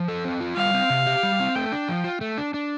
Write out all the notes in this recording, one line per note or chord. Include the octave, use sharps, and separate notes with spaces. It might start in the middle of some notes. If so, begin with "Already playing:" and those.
Already playing: F3
A4
C4
F4
G3 F5
C4
C3
G4
G3
C4
A3 G5
D4
F3
F4
A3
D4
D4